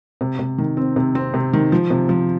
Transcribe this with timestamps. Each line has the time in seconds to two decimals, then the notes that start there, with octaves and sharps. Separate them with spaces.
0.21 C3
0.39 C3
0.58 D#3
0.77 C4
0.96 C3
1.15 C4
1.34 C3
1.53 D#3
1.72 F3
1.90 C3
2.09 F3